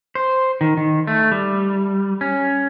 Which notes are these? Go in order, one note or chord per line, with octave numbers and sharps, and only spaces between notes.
C5
D#3
D#3
A3
G3
C#4